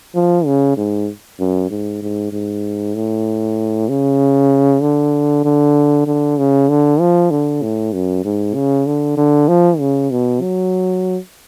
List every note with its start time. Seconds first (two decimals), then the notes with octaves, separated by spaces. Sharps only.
0.15 F3
0.46 C#3
0.77 G#2
1.40 F#2
1.71 G#2
2.03 G#2
2.33 G#2
2.95 A2
3.89 C#3
4.82 D3
5.45 D3
6.07 D3
6.38 C#3
6.69 D3
7.00 F3
7.31 D3
7.62 A2
7.93 F#2
8.25 G#2
8.55 C#3
8.86 D3
9.17 D3
9.48 F3
9.79 C#3
10.11 B2
10.41 F#3